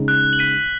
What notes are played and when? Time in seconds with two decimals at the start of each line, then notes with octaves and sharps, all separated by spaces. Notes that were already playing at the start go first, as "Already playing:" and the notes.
Already playing: C#3 G#3 D#4
0.08 F#6
0.33 F#7
0.39 B6 D#7